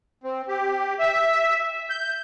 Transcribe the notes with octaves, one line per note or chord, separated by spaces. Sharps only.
C4
G4
E5
G6